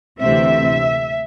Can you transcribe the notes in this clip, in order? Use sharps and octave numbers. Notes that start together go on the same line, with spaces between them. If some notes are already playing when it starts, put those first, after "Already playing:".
D2 C3 E3 A3 C4 E5